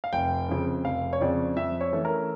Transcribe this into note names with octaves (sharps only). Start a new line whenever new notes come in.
F5
F1 G5
F2 C#3
F1 F5
C#5
F2 C#3 D5
F2 E5
C#5
E3 A3 C#4 A4
A#4